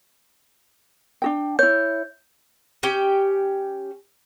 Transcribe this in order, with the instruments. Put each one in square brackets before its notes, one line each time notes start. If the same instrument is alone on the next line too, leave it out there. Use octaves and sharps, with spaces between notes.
[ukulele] D4 F#4 G5
[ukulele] E4 C#5 [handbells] G6
[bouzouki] C#4 G4 G5